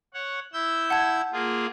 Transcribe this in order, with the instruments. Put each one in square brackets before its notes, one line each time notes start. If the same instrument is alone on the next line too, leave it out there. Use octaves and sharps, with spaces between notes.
[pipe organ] C#5 F#5
E4 E6 G6
[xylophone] F#5 A5 G#6
[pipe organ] A#3 F4 G#4